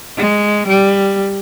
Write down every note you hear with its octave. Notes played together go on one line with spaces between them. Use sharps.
G#3
G3